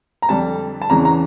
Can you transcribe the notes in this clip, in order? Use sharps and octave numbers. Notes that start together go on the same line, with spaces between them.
A#5
F2 D3 G3 D4 A5
A5
E2 C#3 E3 A#5
A#5